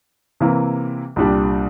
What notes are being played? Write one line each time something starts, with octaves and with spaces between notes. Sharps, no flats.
C3 E3 A#3
C2 A#2 G3 D4 G4